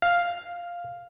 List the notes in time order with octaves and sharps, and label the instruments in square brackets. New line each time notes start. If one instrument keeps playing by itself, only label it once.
[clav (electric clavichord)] F5